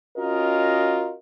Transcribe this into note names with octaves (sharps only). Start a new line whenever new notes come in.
C#4 F4 F#4 A#4 D#5